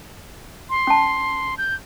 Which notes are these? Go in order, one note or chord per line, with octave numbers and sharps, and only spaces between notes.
C6
C#4 A5
G6